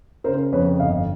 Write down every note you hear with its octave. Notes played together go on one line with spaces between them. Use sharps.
C#3 A#4 C5
F2 B4 C#5
G1 D#5 F5